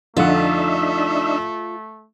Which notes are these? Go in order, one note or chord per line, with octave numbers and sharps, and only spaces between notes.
F2 D3 A3 D4 D#4 F4 E5 F#5